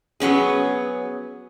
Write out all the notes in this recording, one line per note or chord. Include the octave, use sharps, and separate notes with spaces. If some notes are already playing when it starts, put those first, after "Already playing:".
F#3 B3 C#4 G#4